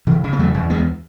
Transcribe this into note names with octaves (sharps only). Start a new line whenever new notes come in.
C#3 E3
C#3
B3
E2 F#3 A3
E2
D2 G#3 B3